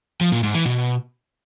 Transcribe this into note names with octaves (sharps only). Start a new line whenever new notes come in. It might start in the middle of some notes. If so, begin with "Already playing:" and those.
F3
A#2
G#2
E3
B2